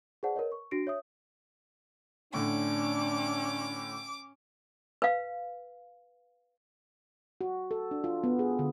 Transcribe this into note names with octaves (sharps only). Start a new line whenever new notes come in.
G#4 B4 C5 D5 F#5 A5
A#4 B4 C#5 D#5
C#6
D4 F#4 A#6 C7 D7
C#5 E5 D#6
A2 D3 C#4 D4 D6
B4 F5
F#4
A4
D4
F4
B3
G#4
D3